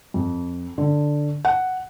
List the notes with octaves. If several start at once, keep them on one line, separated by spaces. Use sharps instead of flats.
F2
D3
F#5